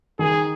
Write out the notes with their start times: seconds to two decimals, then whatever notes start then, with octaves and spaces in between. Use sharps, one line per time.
0.19 D#3 G#4